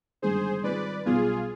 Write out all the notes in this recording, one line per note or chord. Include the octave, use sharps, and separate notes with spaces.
G1 G2 D#3 G#3 G#4 C5
G#2 D#3 G3 C4 F4 B4 D5
B1 B2 G3 B3 F4 G#4